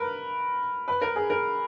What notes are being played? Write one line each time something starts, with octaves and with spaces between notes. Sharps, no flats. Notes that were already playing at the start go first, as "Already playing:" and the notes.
Already playing: A#4 B4
B4
A#4
G#4
A#4